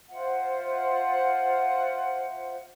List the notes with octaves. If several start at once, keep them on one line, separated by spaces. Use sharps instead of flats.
F4 C5 E5 F#5